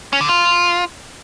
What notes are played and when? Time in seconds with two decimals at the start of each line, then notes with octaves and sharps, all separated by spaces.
0.13 C#4
0.21 D3
0.29 F4